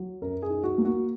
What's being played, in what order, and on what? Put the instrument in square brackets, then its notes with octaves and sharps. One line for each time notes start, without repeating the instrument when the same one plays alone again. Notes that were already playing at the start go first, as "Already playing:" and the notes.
Already playing: [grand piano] F#3
F#2 A#4
G#4
D#4
F#4
A#3
F#4